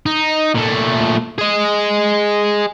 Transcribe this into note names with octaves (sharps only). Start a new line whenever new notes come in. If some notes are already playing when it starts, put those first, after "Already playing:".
D#4
A#2 A3
G#4 D#5